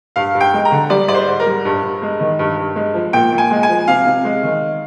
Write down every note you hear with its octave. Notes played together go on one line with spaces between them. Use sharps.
G2 F5
G2
G5
G#3
A#5
D3
G3 D5
G#2 D5
C5
G#2
A#4
G3
G2
G2
G#3
D#3
G2
G2
G#3
F3
A#2 G5
A#2
G#5
G#3
G#5
F3
C3 F5
C3
G#3
D#3